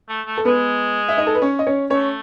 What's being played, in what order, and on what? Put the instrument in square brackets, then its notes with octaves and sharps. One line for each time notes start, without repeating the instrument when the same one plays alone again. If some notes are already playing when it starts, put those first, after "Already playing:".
[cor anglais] A3
A3
[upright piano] A4
[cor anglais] G#3 [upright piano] B3 B4
[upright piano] E5
D#4 D#5
A4
B4
C#4 C#5
D#5
C#4 C#5
[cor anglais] A3 [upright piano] C#4 C#5